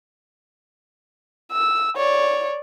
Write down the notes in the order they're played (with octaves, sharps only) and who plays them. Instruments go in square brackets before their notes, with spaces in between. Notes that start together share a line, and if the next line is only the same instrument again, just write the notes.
[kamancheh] E6
C#5 D5